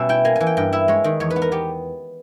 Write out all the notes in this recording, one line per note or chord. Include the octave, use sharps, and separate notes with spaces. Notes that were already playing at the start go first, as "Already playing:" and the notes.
Already playing: B2 G3 C#4 E5
E4 G5
A#3 G#5
E3 G#5
G5
G2 G5
E4 E5
G#3 C#5
D#3
E2 C#5
B4
B3
A#4
B3 G4